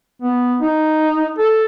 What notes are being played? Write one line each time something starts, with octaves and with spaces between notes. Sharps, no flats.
B3
D#4
A4